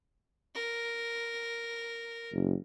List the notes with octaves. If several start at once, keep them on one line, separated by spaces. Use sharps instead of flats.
A#4
F#1